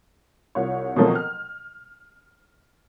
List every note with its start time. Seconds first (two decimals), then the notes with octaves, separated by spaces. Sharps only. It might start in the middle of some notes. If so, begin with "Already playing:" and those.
0.55 C2 F4 C#5
0.96 B2 D#3 F3 F#3 A3 C4
1.15 F6